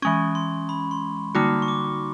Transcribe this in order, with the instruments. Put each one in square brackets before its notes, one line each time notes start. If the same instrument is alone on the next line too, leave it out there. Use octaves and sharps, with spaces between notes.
[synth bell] E3 G#3 C#4 [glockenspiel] C#6
[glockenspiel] C6
B5
C6
[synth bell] D3 G3 A#3 D#4 F#4 [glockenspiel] D6
[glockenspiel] C#6
D6